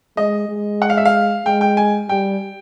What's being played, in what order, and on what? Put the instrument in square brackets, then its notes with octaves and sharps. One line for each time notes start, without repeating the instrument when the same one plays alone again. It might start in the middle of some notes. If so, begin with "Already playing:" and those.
[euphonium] G#3 [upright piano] D#5
[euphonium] G#3
[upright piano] F#5
F5
E5
F5
[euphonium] G#3 [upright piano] G5
[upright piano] G5
G#5
[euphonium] G3 [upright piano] G5